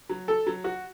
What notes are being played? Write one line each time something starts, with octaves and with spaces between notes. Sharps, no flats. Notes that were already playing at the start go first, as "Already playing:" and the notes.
F#3
A4
F#3
F#4